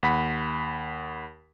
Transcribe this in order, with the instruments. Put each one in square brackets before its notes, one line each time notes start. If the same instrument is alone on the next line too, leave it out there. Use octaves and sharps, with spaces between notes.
[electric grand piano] D#2 F#5 B5 B6